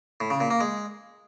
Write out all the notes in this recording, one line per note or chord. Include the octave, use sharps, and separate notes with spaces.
A2
C#3
A#2
A#3
G#3